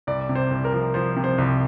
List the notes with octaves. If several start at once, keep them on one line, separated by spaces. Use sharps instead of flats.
C2 D5
C3
C5
C2
A#4
F3
F3 C5
C3
C5
C2